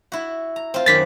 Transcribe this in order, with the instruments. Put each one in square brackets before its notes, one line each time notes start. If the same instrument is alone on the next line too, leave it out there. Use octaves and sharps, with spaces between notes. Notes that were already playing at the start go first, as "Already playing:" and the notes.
[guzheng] E4 F#4
A#5
C4 F4
[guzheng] F#2 D#3 D5 [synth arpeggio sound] A6 B6